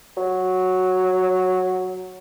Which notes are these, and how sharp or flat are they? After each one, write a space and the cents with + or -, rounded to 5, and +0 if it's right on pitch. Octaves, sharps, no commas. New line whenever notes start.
F#3 -5